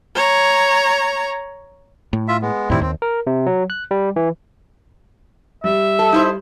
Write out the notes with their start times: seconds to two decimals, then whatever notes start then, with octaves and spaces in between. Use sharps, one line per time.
0.15 C#5 A#5
2.13 A2
2.28 F4 E5
2.42 G#3 B3
2.70 F2 A2 D#3 G3 C4 E4
2.81 D#2 C4
3.02 A#4
3.27 C3
3.46 F#3
3.70 F#6
3.91 G3
4.16 E3
5.64 G3 E5
5.99 A4
6.12 D#4 E4 C5